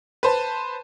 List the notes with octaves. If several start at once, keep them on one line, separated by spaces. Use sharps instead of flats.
B4 C5 A5